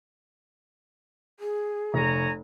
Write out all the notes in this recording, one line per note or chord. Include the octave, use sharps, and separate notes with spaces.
G#4
F1 C#5 G#5 A#5